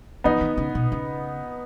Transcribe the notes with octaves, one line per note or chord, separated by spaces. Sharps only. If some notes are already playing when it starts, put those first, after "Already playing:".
E3 B3 D#4
D#3
C#3
B2
C#3